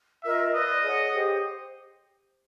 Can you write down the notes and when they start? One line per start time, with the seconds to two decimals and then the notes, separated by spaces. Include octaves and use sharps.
0.23 F4 A#4 D#5 E5
0.54 B4 D5 D#5 F5
0.84 G#4 C#5 F#5
1.14 G4 C5